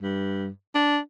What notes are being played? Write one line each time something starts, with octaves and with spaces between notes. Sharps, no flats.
G2
D4